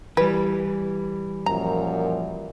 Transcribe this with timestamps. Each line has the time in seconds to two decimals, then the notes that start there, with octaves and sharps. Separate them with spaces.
0.17 E3 G3 B4
1.46 F#2 A#2 F3 A#5